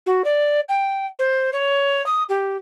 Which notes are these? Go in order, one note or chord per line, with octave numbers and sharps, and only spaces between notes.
F#4
D5
G5
C5
C#5
D#6
G4